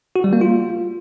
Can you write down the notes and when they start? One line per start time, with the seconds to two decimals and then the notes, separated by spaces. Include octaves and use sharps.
0.16 F#4
0.24 G3
0.33 A#3
0.41 F4